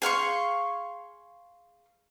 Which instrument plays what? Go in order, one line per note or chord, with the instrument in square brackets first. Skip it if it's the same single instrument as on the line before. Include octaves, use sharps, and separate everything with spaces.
[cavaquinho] G#4 F5 C6 C#6